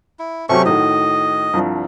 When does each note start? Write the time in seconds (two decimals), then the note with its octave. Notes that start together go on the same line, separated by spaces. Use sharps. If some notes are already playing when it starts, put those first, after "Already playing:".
0.19 E4
0.49 C3 F#3 A3 C#4 G4 C#6
0.65 A2 D#3 F#4 D#5
1.53 C2 G2 F3